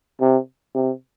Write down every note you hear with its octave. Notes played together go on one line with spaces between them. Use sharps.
C3
C3